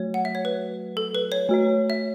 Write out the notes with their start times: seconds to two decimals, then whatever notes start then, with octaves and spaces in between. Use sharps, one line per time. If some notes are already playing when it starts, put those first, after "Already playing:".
Already playing: F#3 A3 F#4 C#5
0.14 F#5
0.25 E5
0.35 C#5
0.45 B4
0.97 A4
1.15 B4
1.32 C#5
1.49 A3 F#4 C#5
1.90 E5